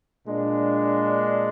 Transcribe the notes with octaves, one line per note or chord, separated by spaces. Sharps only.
A#2 G#3 D4